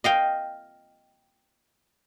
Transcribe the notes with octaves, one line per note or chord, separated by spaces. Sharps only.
D#5 F5 G5